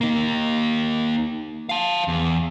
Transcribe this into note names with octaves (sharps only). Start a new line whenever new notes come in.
A#3 D#4
F5 A5
E2